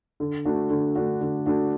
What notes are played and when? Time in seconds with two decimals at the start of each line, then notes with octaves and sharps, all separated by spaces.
0.20 D3
0.45 A3 D4 F#4
0.70 D3
0.96 A3 D4 F#4
1.21 D3
1.46 A3 D4 F#4